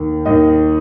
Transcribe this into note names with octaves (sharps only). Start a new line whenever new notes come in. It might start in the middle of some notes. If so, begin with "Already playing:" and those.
Already playing: D#2 D#3
D#2 D#3 D#5